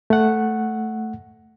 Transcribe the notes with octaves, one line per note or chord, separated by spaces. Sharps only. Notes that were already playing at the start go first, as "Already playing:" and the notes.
A3 F#5